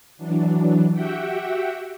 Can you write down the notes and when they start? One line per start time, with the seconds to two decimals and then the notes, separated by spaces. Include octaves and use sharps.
0.17 E3 F#3 D4
0.92 F#4 G4 E5 F#5 G5